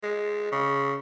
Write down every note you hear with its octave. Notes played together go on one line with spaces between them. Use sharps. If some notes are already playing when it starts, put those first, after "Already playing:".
G#3
C#3